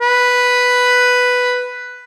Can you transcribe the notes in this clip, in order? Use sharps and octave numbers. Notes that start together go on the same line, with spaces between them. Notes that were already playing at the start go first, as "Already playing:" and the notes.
B4